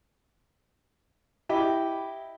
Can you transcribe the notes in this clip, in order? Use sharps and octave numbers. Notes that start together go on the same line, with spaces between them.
E4 G4 D#5 B5